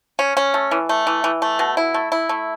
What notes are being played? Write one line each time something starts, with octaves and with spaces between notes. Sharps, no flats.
C#4
C#4
A3
E3
A3
E3
E3
A3
B2
E4
A3
E4
A3